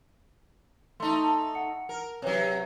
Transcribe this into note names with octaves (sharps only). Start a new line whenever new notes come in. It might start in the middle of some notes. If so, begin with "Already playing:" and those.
A3 D#4 C6
F#5 C#7
A#4
C3 F#3 B4 C#5